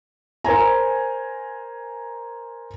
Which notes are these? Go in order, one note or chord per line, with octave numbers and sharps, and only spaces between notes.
A#4 C5 G#5 A#5